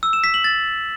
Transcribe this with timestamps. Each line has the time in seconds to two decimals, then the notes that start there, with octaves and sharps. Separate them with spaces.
0.03 E6
0.13 E7
0.24 B6
0.34 F#7
0.44 A6